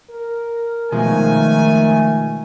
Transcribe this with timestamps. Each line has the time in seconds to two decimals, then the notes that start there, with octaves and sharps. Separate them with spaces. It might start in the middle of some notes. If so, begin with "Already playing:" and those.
0.10 A#4
0.92 B2 D#3 F3 G#3 A3 G#5